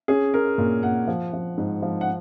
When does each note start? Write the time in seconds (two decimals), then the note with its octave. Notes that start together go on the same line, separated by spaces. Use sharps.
0.08 C#4 G#4
0.34 C#4 A#4
0.58 A#2
0.83 A#2 F#5
1.07 F3
1.33 F3
1.57 G#2
1.82 F3
2.01 F#5